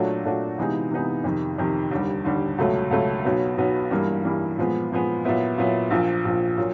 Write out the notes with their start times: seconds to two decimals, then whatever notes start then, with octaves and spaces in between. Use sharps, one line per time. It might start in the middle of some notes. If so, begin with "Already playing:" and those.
Already playing: A#2 F#3 A3 D4 F#4
0.24 A#2 F#3 A3 D4 F#4
0.58 C3 E3 G#3 B3 D#4
0.91 C3 E3 G#3 B3 D#4
1.24 F2 C3 D#3
1.58 F2 C3 D#3
1.91 D#2 D3 G3
2.25 D#2 D3 G3
2.58 C#2 B2 F#3 A3
2.91 C#2 B2 F#3 A3
3.25 B1 B2 F#3 B3
3.57 B1 B2 F#3 B3
3.91 G2 E3 G3 A#3
4.24 G2 E3 G3 A#3
4.58 A#2 F3 G#3 B3
4.91 A#2 F3 G#3 B3
5.24 A#2 F#3 B3 E4
5.58 A#2 F#3 B3 E4
5.90 A#1 A#2 F3
6.25 A#1 A#2 F3
6.57 A#2 F#3